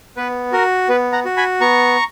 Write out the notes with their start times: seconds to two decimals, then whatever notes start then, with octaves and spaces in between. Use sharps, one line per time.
0.17 B3 B4
0.52 F#4 A#4
0.89 B3 B4
1.12 F#5 A#5
1.25 F#4
1.37 G#5 B5
1.60 B3 A#5 C#6